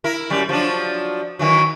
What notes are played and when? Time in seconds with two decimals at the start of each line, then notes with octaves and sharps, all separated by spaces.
0.04 E4 A#4
0.30 F#2 G3
0.49 F3 F#3 D4
1.39 D#3 E3 F#3